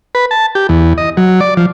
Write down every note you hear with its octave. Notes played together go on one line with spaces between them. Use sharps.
B4
A5
G4
E2
D#5
F#3
D5
F3